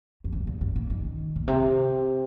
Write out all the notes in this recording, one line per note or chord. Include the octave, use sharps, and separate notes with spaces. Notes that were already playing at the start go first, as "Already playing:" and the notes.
F2
G2
A#2
G2
A#2
D#3
A#2
C3